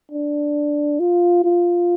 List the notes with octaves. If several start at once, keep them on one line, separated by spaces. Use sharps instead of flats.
D4
F4
F4